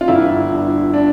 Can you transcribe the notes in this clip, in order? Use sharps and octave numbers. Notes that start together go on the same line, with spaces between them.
F4
G1 E4
G2
D4